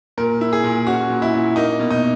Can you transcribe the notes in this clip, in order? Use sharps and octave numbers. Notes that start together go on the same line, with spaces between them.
A#2 A#4
E4
G#4
A#2
C#4 F#4
A#2
E4
A#2
A#3 D#4
B2
D#4